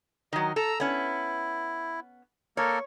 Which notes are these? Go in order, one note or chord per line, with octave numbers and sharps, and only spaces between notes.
D#3 F#3 D#5
A4 A#5 E6
B3 C#4 E4
A#3 A4 A#4 C#5